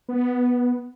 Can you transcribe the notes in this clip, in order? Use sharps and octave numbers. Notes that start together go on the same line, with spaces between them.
B3